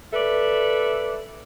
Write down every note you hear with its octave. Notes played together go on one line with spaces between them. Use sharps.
A4 B4 D5 E5